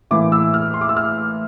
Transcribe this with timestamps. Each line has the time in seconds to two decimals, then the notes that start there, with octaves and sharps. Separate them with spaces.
0.11 A2 E3 A#3 D6
0.32 E6
0.54 F6
0.74 C6
0.81 D6
0.89 E6
0.97 F6